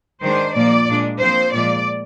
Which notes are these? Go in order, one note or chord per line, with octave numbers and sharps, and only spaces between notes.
D#3 G#3 D4 C5
A#2 F3 A#3 D5
A#2 G#3 D4
A#2 F3 C4 C5
A#2 F3 G#3 D5